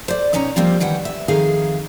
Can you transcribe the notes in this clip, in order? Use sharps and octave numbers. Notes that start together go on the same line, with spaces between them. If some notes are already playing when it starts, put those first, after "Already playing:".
C5 D5
B2 C#4 D#4 C#5 A#5
F3 G3 A#3 C4 F4
D#3 E3 F#5 G5
E5
F2 D#3 D#4 G#4 F5